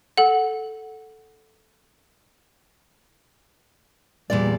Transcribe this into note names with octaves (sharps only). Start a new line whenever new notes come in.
A4 F#5
E2 A#2 G3 D5